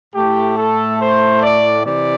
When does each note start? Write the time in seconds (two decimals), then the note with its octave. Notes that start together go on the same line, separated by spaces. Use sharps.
0.13 A2 A3 G4
0.57 A4
1.00 C5
1.42 D5
1.84 C3 E3 D5